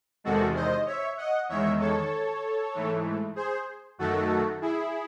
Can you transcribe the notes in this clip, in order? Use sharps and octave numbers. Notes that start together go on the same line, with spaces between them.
E2 C3 D#3 G#3 F#4 A4
C5 D#5
C#5 E5
D#5 F#5
E2 D#3 G#3 C#5 E5
A4 C#5
G#2 E3 A3
G#4 C5
F#2 D#3 A3 F#4 A4
E4 G#4